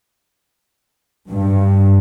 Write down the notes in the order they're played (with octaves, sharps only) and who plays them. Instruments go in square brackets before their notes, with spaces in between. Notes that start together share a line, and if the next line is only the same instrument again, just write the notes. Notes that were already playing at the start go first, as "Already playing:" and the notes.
[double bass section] G2